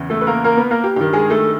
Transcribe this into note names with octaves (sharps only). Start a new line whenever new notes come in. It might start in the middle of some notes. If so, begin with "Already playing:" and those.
Already playing: E2 C#3 E3
A3 A4
B4
A#3 A#4
A#3 A#4
B3 B4
A#3 A#4
G4
G2 D#3 G4
G#3 G#4
A3 A4